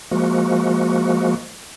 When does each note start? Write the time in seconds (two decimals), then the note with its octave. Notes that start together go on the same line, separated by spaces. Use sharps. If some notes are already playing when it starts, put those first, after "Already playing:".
0.11 F3 G#3 A#3 F#4